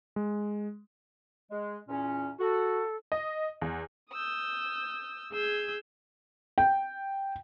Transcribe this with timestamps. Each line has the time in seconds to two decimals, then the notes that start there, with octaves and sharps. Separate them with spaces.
0.16 G#3
1.51 G#3
1.88 E2 A#2 C#4
2.40 F#4 A4
3.12 D#5
3.62 E2
4.11 D#6 E6 G6
5.32 G#4 E6 G6 G#6
6.58 G5